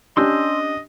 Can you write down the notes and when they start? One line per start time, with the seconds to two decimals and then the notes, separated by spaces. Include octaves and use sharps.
0.17 C#4 D4 G4 D#5 C6 E6 G6